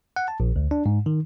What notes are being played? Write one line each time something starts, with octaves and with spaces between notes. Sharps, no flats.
F#5
A5
A#1
D2
D4
G#2
D#3